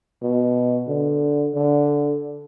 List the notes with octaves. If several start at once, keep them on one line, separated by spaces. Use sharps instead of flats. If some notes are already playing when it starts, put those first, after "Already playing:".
B2
D3
D3